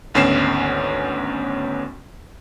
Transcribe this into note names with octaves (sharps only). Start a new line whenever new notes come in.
G#1 D2 B3 C#4 C7 E7